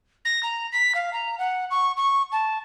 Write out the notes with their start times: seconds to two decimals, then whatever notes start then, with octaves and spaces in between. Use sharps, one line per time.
0.25 A#6
0.43 A#5
0.72 B6
0.95 F5
1.13 A#5
1.39 F#5
1.71 C#6
1.97 C#6
2.32 A5